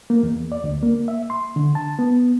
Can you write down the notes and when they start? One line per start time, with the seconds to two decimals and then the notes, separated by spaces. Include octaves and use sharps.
0.10 A#3
0.23 E2
0.52 D5
0.64 D2
0.83 A#3
1.08 E5
1.30 C6
1.56 D3
1.75 A5
1.99 B3